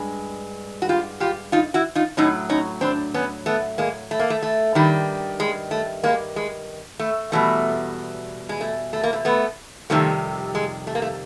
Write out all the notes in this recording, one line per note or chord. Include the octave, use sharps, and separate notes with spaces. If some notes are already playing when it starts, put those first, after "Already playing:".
Already playing: G2 G#3
F#4
F4 G4
F4 G4
D#4 F4
E4 F#4
D#4 F4
A2 F#3 C#4 D#4
C#4 D#4
C4 D4
B3 C#4
A3 B3
G#3 A#3
A3
A#3
A3
A3
G2 D#3 G3
G#3
A3
G#3 A#3
G#3
A3
E2 B2 G3 A3
G#3
A3
A3
A#3
A3
A3 B3
F2 C3 D#3 G3 A3
G#3
A3
A#3
A3